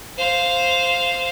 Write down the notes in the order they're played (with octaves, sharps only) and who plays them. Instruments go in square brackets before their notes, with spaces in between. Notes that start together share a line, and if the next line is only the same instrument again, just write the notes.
[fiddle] C5 F5